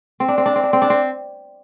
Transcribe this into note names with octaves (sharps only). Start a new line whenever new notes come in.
C4
D4
C4
D4
C4
D4
C4
D4
C4